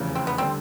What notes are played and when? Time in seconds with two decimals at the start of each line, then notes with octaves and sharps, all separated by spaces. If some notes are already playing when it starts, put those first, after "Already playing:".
Already playing: F1 E2 C#3
0.15 C4
0.27 B3
0.38 D3 G3 C4